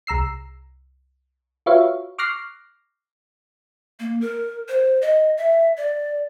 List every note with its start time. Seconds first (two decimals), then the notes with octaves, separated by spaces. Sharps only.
0.07 C2 A#5 E6 C7
1.66 F4 F#4 B4 C#5 E5 F5
2.18 C#6 D6 F6 F#6 A#6 C7
4.00 A#3
4.21 A#4
4.68 C5
5.02 D#5
5.38 E5
5.77 D5